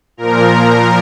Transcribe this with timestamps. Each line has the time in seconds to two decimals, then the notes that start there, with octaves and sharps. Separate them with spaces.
0.17 A#2 F3 A#4